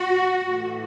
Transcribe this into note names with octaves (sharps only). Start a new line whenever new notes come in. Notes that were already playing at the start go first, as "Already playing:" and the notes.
Already playing: F#4
A2 E3 A3